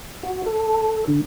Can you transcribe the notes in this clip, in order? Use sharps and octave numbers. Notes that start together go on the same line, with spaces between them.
F#4
A4
D3